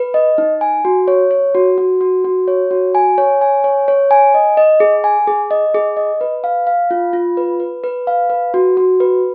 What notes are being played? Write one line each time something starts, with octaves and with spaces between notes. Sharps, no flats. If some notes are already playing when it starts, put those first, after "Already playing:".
Already playing: B4
D#5
D#4
G#5
F#4
C#5
C#5
F#4
F#4
F#4
F#4
C#5
F#4
G#5
C#5
G#5
C#5
C#5
G#5
D#5
D#5
G#4
G#5
G#4
D#5
G#4
D#5
B4
F5
F5
F4
F4
B4
B4
B4
F5
B4
F#4
F#4
B4